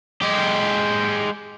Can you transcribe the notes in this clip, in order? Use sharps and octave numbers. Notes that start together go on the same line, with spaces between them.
G#3 G4